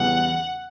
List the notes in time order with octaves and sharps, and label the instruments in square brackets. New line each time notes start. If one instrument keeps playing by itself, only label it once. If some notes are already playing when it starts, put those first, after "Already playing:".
Already playing: [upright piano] E2 C#3 E3 G3 B3 [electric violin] F#5